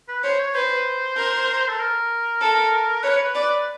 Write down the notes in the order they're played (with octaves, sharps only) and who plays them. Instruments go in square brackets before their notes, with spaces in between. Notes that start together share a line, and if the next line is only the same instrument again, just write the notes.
[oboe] B4
[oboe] C5 [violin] C#5
[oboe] C#5
[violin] B4 [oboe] C5
[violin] A#4
[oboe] A4
A#4
[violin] A4
[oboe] B4 [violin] C#5
[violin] D5